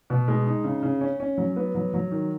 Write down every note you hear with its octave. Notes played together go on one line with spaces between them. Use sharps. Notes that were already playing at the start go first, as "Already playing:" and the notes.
B2
G#3
D#4
C#3
C#3
C#4
C#4
F#3
B3
F#3
F#3
D#3